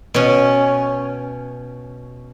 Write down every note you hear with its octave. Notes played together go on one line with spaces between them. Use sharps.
B2 C#4